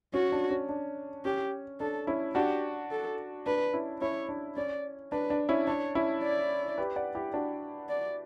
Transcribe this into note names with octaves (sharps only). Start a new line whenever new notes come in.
C#4 F#4
D4
C#4
D4
C#4 G4
D4 A4
C#4 E4
D4 F#4 G4
A4
D4 B4
C#4 E4
C#4 E4 C#5
D4
C#4 D5
D4 B4
D4
C#4 E4
D4 C#5
C#4 E4
D5
G4 B4
D5 F#5
E4 G4
D4 F#4
D5